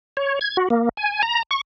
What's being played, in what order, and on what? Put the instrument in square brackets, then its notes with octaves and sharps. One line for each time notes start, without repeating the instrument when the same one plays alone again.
[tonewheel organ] C#5
G#6
F#4
A#3
G#5
A#5
C#6